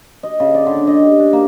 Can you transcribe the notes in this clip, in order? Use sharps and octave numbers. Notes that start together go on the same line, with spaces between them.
D#5
C#3
D5
D3
D#5
G4
D4
A#3